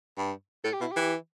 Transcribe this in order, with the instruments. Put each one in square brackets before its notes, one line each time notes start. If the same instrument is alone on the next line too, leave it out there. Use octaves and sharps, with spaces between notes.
[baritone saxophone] G2
[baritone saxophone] A2 [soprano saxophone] A4
[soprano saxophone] G4
[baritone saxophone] B2 [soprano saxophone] E4
[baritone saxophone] E3 [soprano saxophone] G4